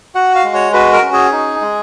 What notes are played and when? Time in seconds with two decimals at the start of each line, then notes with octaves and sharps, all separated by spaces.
0.15 F#4 F#5
0.35 F5
0.45 G#3
0.54 C#5
0.73 F#4 B4
0.93 A#4
1.02 C#4
1.13 G#4
1.32 D#4
1.61 G#3